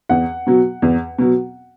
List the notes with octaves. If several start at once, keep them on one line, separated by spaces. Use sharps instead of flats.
E2 F#5
B2 F#3
E2
B2 F#3